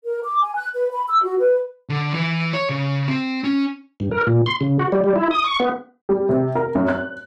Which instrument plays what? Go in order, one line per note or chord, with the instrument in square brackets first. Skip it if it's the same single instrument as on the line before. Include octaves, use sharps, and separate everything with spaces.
[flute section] A#4
D6
G#5
F#6
B4
B5
E6
F#4
B4
[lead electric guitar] D3
E3
C#5
C#3
C4
C#4
[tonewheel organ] G2
A#4
A#2
C6
C#3
F#4
G3
G3
E4
D#6
C#6
B3
[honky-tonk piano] G3
C3
A#4
F#2
F#6